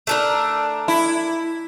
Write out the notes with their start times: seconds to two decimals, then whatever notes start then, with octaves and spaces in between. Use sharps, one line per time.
0.07 A3 D4 A#4
0.88 E4